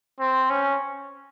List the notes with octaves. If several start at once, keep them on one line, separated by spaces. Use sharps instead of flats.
C4
C#4